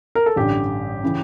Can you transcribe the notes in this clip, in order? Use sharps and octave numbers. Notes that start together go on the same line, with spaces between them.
A#4
A4
A1 G2 D3 G4
C#3 E3